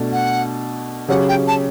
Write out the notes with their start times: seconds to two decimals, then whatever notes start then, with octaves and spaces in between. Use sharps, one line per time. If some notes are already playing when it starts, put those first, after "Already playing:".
Already playing: B2 A3 D4
0.12 F#5
1.08 C#3 F#3 C#4 G4 F#5
1.29 G5
1.48 A5